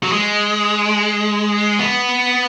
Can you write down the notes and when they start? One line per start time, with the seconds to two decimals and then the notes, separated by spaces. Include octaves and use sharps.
0.03 F#3
0.12 G#3
1.79 B3